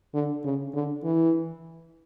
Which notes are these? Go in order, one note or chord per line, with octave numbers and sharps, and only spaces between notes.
D3
C#3
D3
E3